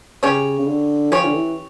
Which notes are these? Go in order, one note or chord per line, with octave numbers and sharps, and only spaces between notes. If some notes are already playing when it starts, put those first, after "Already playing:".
C#3 C#4 G4 C#5
C#3
D3
F3 C#4 G4 C#5
D3
E3